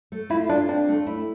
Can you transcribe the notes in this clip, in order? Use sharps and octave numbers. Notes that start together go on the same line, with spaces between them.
A3
E4 F4
D4 F4
C4 D4
A3
E4